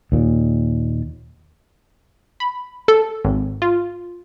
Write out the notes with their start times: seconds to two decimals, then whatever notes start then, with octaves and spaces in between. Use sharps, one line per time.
0.12 D#2 A#2
2.40 B5
2.88 A4
3.24 G#1
3.62 F4